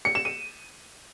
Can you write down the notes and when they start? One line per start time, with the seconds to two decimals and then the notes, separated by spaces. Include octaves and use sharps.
0.05 C#7
0.15 E7
0.25 D#7